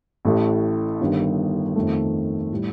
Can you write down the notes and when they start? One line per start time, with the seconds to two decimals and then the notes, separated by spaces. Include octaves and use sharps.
0.25 A1 A2 A3
1.01 G1 G2 D#3
1.76 F2 D#3 A3
2.52 A2 G3